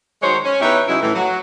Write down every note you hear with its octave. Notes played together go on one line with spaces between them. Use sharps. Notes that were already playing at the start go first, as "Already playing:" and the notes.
D#3 F#3 G#3 C5 C#5
C#4
E2 D#4 G4 B4 C#5 E5
C#3 F#3 G#3 D#4 E4
A2 E3
F#3